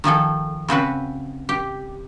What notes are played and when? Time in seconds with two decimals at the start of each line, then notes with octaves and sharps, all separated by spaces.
0.04 D#3 F3 G#4 A4
0.69 C#3 C4 F#4 B4
1.49 G4